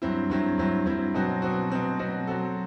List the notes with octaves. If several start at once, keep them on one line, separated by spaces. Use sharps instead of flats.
G2 F#3 C4 E4
G2 F#3 C4 E4
G2 F#3 C4 E4
G2 F#3 C4 E4
B2 F#3 C4 F#4
B2 F#3 C4 F#4
B2 F#3 C4 F#4
B2 F#3 C4 F#4
F#3 C4 F#4 A4